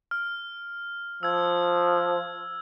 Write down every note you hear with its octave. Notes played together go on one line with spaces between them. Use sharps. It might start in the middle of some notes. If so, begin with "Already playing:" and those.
F6
F3 E6 G#6